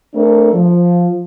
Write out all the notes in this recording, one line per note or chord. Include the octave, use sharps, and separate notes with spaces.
A3 C4 D4 A4 A#4
F3